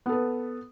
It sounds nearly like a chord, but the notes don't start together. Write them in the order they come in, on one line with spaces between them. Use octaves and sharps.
B3 A4 B4